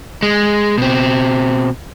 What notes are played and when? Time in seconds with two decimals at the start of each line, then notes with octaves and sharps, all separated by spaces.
0.23 G#3
0.78 B2 C4